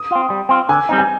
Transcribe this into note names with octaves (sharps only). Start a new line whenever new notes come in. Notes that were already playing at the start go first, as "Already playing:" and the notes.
Already playing: D#6
C4 F4
G3
C4 F4
D3 G#5
G3 C4 D#4
G#5